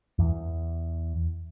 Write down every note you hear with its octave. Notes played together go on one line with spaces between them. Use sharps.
E2